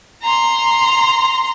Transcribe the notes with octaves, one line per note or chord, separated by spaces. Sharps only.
A#5 C6